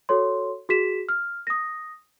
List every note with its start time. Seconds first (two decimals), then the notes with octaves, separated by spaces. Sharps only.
0.09 F#4 A4 C#5 C6
0.69 F#4 G#4 B6 E7
1.09 F6
1.47 D#6 A#6